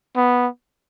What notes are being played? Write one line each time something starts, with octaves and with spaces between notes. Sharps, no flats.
B3